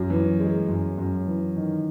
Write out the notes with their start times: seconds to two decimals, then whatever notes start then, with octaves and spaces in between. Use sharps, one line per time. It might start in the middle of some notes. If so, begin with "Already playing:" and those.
Already playing: F#2
0.10 E3
0.40 G#3
0.68 F#2
0.98 F#2
1.26 E3
1.57 D#3